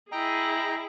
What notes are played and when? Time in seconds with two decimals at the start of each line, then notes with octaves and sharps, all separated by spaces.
0.12 E4 G#4 D#5 G5 A#5